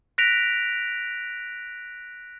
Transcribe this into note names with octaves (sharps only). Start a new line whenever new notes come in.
F#6 A#6 B6 D7 F7